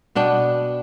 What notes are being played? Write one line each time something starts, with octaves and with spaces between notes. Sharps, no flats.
B2 B3 D4 G5